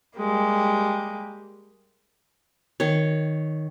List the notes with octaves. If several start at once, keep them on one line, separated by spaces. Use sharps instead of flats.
G3 G#3 A#3 G4
D#3 C#5